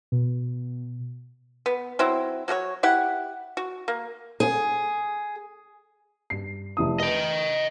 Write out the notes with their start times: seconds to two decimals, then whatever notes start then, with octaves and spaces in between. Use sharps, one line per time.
0.12 B2
1.66 B3
1.99 F#3 C4 E4
2.48 F#3 F#4 A#4 C#5
2.83 E4 G4 F#5
3.57 F#4
3.88 A#3
4.40 G#4
6.30 G2 C7
6.77 F1 E4 D#6
7.00 B4 D#5 G5